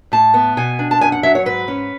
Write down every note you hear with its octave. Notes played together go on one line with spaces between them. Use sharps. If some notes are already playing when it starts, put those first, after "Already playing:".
A2 A5
B3
B2 G#5
D4
A5
F#2 G#5
F#5
F#3 E5
C#5
G#2 B4
C#4